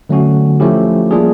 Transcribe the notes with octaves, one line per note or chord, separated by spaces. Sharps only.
D3 F#3 A3 C#4 F#4
F3 A3 C#4 E4 G4
G3 A#3 D4 F4 G#4